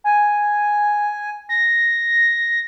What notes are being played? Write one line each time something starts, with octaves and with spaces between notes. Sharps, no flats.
G#5
A#6